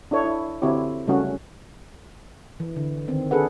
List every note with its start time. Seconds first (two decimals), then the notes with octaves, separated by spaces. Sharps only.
0.11 D4 E4 A4 C#5
0.24 E4
0.62 D3 C4 E4 F#4 G4 C#5
1.07 C#3 G3 A3 C#4 F#4
2.60 E3
2.76 D3
3.08 D#3 C4
3.31 D4 G#4 A4 B4 F#5